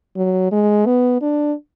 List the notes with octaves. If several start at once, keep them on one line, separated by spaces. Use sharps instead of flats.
F#3
G#3
B3
D4